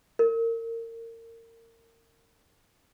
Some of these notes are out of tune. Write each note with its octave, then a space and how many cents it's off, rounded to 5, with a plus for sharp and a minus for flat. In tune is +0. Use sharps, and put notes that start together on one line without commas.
A#4 -30